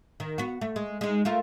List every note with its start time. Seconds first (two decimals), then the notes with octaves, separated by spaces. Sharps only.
0.20 D#3
0.38 B3 F#4
0.61 A3
0.76 G#3
1.01 G#3 D#4
1.25 A3 F4 A#4